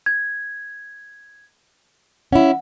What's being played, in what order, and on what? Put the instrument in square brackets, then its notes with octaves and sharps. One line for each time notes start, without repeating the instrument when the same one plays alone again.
[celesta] G#6
[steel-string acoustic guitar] C#4 E4 [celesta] F#5